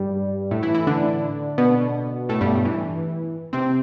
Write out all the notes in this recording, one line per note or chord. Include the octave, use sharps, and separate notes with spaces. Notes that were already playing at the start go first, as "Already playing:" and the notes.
Already playing: G2 G3
A2 A3
E3 E4
E3 E4
D3 D4
B2 B3
A2 A3
G2 G3
E3
C3 C4